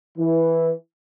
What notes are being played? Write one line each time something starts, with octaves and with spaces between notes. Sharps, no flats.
E3